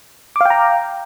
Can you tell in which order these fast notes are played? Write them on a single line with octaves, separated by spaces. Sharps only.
D6 F5 G5 A#5